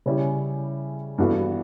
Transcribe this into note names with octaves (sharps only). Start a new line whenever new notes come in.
C#3 G3 C#4 E4 G4
G2 E3 B3 F#4 A4